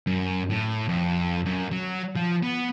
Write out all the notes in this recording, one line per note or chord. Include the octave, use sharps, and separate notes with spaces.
F#2
A2
F2
F#2
F#3
F3
B3